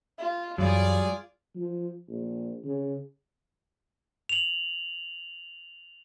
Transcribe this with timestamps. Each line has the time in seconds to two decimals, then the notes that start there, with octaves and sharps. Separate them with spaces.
0.19 F4
0.58 F#2 E3 F#3 G3 F4 G#4 D5
1.55 F3
2.09 A#1
2.64 C#3
4.29 F7 F#7